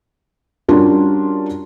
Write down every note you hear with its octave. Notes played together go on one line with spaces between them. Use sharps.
G3 C#4 D4 F4 F#4 A#4